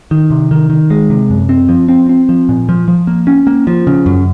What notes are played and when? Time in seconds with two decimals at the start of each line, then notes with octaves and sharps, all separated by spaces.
0.11 D#3
0.30 C3
0.51 D#3
0.70 D#3
0.90 G#3
1.10 C3
1.30 F#2
1.49 C4
1.69 F3
1.89 C4
2.09 C4
2.29 F3
2.49 A#2
2.69 F3
2.88 F3
3.07 A#3
3.27 C#4
3.47 A#3
3.67 F3
3.87 C#3
4.06 F#2